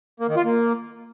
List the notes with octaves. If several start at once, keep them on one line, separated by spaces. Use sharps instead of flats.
A#3
D#3
F4
A#3